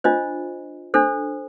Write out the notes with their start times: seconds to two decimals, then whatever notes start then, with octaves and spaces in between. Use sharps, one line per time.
0.04 D4 F4 C5 D#5
0.94 D4 A4 C5